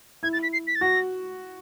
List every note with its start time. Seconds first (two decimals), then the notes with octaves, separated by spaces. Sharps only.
0.23 E4 G#6
0.33 A6
0.43 B6
0.53 C7
0.67 B6
0.75 A6
0.81 F#4 A#6